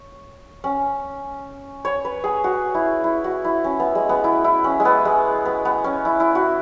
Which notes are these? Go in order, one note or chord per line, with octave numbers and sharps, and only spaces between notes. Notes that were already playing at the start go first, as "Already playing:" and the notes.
Already playing: C#5
C#4
C#5
B4
G#4
F#4
E4
E4
F#4
E4
C#4
B3
G#3
B3
E4
E4
C#4
G#3
B3
G#3
B3
B3
C#4
E4
E4
F#4